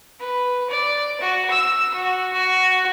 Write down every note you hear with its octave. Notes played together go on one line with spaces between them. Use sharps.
B4
D5
F#4
E6
F#4
F#4